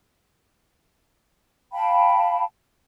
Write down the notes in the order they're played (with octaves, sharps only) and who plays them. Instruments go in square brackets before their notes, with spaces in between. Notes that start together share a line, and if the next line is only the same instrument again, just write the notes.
[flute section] F5 G5 A5 B5